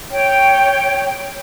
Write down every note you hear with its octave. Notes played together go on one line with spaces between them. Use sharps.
C#5 G5